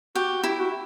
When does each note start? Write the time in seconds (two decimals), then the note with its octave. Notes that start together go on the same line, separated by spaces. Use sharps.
0.15 F#4 G4
0.43 E4 G4
0.60 F#4